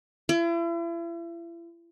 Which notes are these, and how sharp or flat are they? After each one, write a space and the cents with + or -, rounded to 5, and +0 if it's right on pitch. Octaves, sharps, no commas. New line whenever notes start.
E4 +40